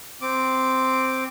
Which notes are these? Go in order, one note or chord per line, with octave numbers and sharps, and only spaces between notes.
C4 D6